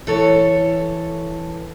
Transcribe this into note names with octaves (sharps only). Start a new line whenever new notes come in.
E3 A4 C#5